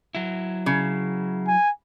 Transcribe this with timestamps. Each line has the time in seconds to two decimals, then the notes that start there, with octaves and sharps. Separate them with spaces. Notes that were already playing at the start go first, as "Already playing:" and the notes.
0.15 F#3 E4
0.66 C#3
1.47 G#5